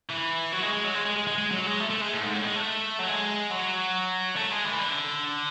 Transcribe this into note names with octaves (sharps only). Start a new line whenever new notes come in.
E3
F#3
G#3
G#3
F#3
G#3
G#3
G#3
G#3
G#3
F#3
G#3
A3
A3
G#3
A2
G#2
A2
G#3
A3
F#3
G#3
F#3
A3
G#3
E3
D3